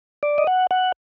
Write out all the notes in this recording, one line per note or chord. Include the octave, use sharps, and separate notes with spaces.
D5
D#5
F#5
F#5